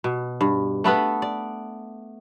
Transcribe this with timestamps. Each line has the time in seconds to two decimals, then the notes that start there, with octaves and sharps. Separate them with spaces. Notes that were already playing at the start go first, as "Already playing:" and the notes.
0.04 B2
0.41 G2
0.84 A3 B3 A4 B4
1.22 D5